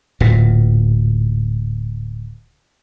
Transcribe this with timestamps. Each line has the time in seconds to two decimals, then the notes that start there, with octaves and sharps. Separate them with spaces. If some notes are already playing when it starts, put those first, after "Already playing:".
0.20 D1 A#2